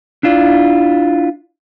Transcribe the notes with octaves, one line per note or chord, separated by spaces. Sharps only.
D4 E4 F4 D5